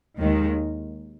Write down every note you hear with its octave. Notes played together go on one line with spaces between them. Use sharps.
D#2 D#3 G#3